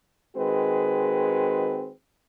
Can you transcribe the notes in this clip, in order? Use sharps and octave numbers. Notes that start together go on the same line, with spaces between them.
D#3 G#3 C4 F#4 G#4 B4